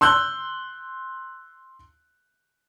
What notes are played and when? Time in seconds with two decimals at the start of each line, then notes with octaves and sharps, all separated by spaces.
0.01 C6 E6 F#6 G6